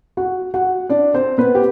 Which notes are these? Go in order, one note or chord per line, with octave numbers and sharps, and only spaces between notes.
F#4 F#5
F#4 F#5
D4 D5
C4 C5
B3 B4
G4